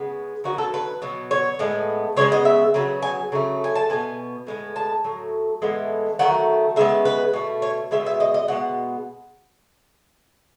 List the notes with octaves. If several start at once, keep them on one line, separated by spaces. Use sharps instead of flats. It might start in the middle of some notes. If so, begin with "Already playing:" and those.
Already playing: C#3 G#3 B3
D#3 F#3 B3 F#4
A4
B4
B2 F#3 B3
C#5
A2 G#3 B3
C#3 G#3 B3 C#5
D#5
E5
C#3 F#3 B3
G#5
C#3 F#3 A3
G#5
A5
B2 G#3 B3 G#5
A2 G#3 B3
A5
A2 F#3
A2 E3 G#3 B3
D#3 F#3 A3 F#5
C#3 G#3 B3 E5
B4
B2 A3
C#5
B2 G#3 B3 E5
E5
D#5
D#5
B2 G#3 B3 F#5